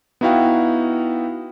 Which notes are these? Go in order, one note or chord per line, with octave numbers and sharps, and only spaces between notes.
B3 D#4 E4 F#4 F5 G5